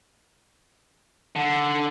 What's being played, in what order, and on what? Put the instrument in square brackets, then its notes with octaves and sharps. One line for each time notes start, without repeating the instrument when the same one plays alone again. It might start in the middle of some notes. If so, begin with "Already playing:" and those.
[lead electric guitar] D3